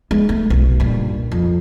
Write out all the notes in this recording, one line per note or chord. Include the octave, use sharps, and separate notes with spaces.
G#3 B3
A3
B1
G2 A#2
F2